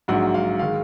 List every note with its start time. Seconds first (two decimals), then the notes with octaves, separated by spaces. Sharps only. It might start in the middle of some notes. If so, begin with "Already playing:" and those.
0.08 A#1 G#2 F#3 F#5
0.34 F5
0.59 D#3 G#3 F5